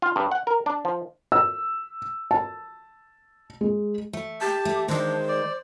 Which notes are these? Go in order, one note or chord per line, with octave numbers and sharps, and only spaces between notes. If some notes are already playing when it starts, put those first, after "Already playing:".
F4
G2
F#5
A#4
D4
F3
E6
A5
G#3
A3
G4 A5
A3
D#3 G#3 D4 C5
D5